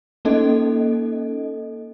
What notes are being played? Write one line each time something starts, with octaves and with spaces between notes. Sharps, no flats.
A#3 C#4 D#4 A4 D#5